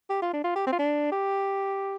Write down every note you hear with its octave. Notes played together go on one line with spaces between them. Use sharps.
G4
F4
D4
F4
G4
C4
F4
D4
G4